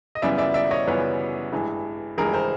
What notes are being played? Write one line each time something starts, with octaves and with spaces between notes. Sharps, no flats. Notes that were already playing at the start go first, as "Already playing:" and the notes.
D#5
F#2 C#3 E3 G3 B3 D5 E5
D5 E5
D5 E5
C#5 D#5
F#2 C#3 E3 G3 B3 B4 C#5
A1 G2 E3 G#3
A1 G2 E3 G#3 G#4 A#4
A#4 C5